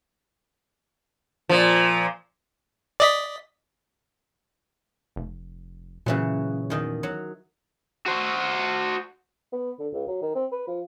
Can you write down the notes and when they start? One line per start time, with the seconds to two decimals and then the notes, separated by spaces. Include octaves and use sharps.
1.49 A#2 F3
3.00 D5 D#5 B6
5.16 F1
6.06 A#2 C#3 E3 F#3
6.70 E2 D#3 D#5
7.03 F#3
8.06 F#4 C5
9.52 B3
9.79 D3
9.93 C#2
10.08 F#3
10.22 D#3
10.35 C4
10.52 B4
10.68 F3